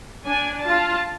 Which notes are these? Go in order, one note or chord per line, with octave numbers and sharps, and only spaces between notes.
D4 G#5
F4 A5